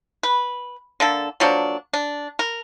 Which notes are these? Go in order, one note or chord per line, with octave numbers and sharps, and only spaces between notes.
B4
D3 A#3 A4
F3 F#3 A#3 D4
D4
A#4